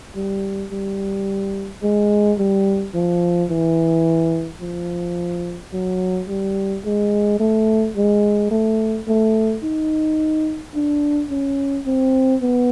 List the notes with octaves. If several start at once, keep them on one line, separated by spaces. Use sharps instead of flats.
G3
G3
G#3
G3
F3
E3
F3
F#3
G3
G#3
A3
G#3
A3
A3
D#4
D4
C#4
C4
B3